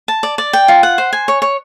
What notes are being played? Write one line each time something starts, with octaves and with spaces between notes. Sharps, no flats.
A5
D5
D5
G5
F4
F#5
C5
G#5
C#5
C#5